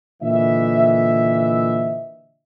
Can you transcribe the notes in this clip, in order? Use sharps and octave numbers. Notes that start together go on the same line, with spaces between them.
A#2 D3 E3 D#5 E5